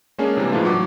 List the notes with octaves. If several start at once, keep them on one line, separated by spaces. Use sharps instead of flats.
G#3 A#3 C#4 D4 G#4
C3 E3 G3 A#3
G#2 E3 F3 A3 D4 F4
A2 F#3 F#5 D6